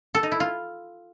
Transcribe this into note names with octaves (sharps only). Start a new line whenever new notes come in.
A4
D#4
E4
F4